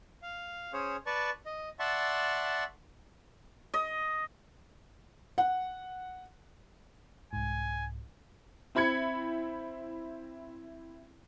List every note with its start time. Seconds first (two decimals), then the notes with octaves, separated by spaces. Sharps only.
0.22 F5
0.73 C#4 G#4 C5 C#5
1.06 B4 D5 A5 C#6
1.46 D#5
1.79 D5 E5 F#5 A5 C6 C#6
3.74 D#5
5.38 F#5
7.33 C2 G#2 G#5
8.75 C4 E4 B5 G#6 C#7